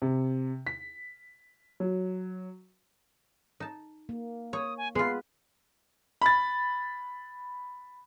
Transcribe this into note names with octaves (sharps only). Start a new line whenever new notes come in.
C3
B6
F#3
D#4 A5
A#3
C#5 D#6
G#5
G#3 B3 F4 B4 C7
B5 A6